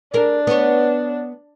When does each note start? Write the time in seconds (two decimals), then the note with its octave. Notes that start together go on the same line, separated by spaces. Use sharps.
0.14 D4 G#4 A#4
0.47 B3 C#5